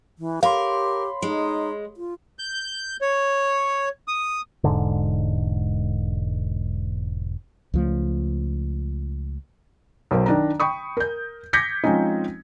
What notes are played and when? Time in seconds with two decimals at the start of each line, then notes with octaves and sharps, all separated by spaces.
0.19 E3
0.43 G4 A#4 C#5 F5 B5 C6
1.22 G#3 D#4
1.97 F4
2.39 G6
3.01 C#5
4.08 D#6
4.64 E1 G#2 D3
7.74 C#2 F3 A3
10.11 B1 F#3 A#4 C5
10.26 D#3 D4 A#5
10.60 G5 B5 C#6 D#6
10.97 A#4 G6
11.53 D6 G6 G#6 A#6 B6 C#7
11.84 F3 G#3 C4 C#4 D#4